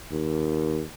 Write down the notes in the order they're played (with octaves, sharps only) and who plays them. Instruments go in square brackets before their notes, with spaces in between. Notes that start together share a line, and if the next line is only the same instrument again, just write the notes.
[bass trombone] D#2